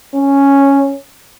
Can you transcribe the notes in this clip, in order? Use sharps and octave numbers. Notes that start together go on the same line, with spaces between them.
C#4